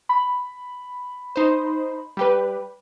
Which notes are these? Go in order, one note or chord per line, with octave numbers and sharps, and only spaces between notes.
B5
D#4 C5
G3 G4 B4